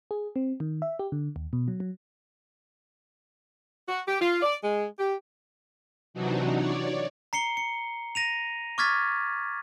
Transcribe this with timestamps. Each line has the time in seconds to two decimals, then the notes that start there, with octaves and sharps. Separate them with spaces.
0.11 G#4
0.36 C4
0.60 D#3
0.82 E5
0.99 G4
1.12 D3
1.36 D#2
1.53 B2
1.68 F#3
1.80 F#3
3.89 F#4
4.07 G4
4.21 F4
4.42 D5
4.63 G#3
4.99 G4
6.14 C3 E3 F#3 D4 D#4 F#4
6.54 C#5 D5
7.33 A#5 C7 C#7 G7
7.57 C#7
8.15 A#6 D#7 F7
8.78 C#6 D6 F6 G#6 A6 B6